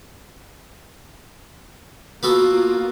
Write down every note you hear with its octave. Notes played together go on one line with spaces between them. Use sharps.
A#3 B3 F4 F#4 A4